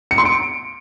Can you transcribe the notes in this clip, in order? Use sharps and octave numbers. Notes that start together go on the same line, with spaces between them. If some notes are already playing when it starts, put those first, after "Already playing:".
C#7
C6
D7